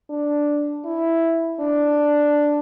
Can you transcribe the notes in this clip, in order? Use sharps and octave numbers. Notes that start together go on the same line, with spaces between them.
D4
E4
D4